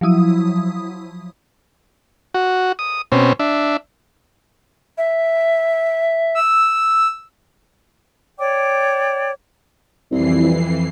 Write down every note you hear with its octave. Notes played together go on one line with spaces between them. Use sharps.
F3 F#3 E4 D#6
F#4
D#6
B2 C4 C#4
D4 E5
E5
E6
C#5 D5 G5 D6
C2 F2 E3 C7